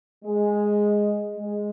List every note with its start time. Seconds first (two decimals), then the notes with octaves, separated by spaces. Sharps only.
0.25 G#3
1.36 G#3